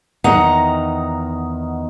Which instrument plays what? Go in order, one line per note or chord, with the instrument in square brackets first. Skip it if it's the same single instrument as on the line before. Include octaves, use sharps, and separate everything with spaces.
[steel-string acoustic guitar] E2 D#3 D#4 F#5 A#5